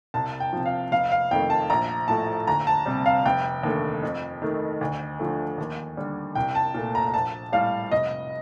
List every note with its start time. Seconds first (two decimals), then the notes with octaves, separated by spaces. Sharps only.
0.14 C2 A5
0.40 G5
0.53 C3 F3
0.66 F5
0.92 F1 F5
1.12 F5
1.31 F2 D#3 A3 G5
1.50 A5
1.70 A#1 A#5
2.08 A2 F3 A3 A5
2.47 D2 A#5
2.67 A5
2.86 C3 G3
3.06 F5
3.26 F1 G5
3.63 D#2 D3 A3
4.03 F2
4.42 D#3 A3
4.81 D2
5.19 D3 F3 A3
5.58 D#2
5.97 D3 G3
6.35 C2 G5
6.55 A5
6.74 A#2 A3
6.95 A#5
7.08 A#5
7.14 A#1 A5
7.52 A2 G3 F5
7.91 F1 D#5